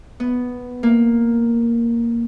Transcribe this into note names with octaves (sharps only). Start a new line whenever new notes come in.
B3
A#3